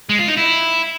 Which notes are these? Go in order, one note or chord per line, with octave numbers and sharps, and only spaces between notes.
G#3
F4
D#4
E4